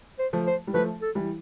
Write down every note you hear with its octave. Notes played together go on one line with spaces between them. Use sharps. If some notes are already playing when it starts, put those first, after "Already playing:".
C5
F3 A3
C5
G3
F3 A3 B4
A4
E3 G3